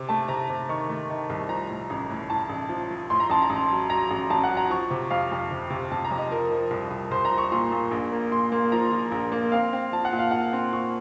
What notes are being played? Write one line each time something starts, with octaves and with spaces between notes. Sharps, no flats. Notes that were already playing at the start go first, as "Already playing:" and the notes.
Already playing: C3
A3 A5
C3 A#5
C3
D#3 C#6
A3
D#3
C2
F3 A#5
A2
A1
A2
A2 A5
A1
F3
F3
A2 C6
A#5
A1 A5
A#5
A1
F#3
F#3 A#5
A1
A1 A5
F#5
F#3
A#5
F3 C#6
C3
F2 F5
F2
C3
C3
C3 A5
A#5
F2
D#5
F3 A#4
F3
C2
C2
C2 C5
A#5
F3
C#6
A#2 C6
A#2
A#1
A#3
A#2 C6
A#3
F3 A#5
F3
A#1
A#3
C4 F5
C4
F3 A5
F#5
A#2
F5
A#2 F#5
C4
A#2 C#6